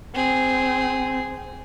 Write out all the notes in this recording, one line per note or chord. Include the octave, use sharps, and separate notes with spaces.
C4 G#4